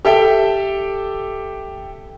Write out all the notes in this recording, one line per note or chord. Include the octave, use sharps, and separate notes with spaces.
G4 A4 E5 G5